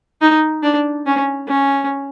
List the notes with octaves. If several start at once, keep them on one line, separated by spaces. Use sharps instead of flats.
D#4
D4
C#4
C#4